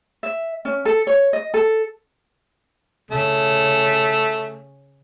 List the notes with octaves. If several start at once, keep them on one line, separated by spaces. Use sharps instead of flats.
E5
C#4
A4
C#5
D#5
A4
C#3 A3